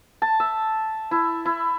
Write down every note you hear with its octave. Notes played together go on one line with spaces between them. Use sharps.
A5
E5
E4
E4